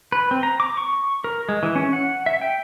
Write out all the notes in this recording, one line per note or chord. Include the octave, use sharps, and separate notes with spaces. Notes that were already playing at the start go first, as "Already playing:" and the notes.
B4
C4
A#5
D6
C#6
A#4
G#3
E3
C#4
F#5
E5
G5